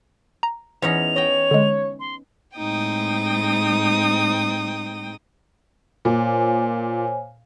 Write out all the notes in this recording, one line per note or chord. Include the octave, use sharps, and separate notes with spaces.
A#5
E2 C#4 D#4 F7
C#5 D#5 G5
D3 G#3
C6
A2 G#3 C4 D#4 G5 D#6
A#2 C5 C#5 G#5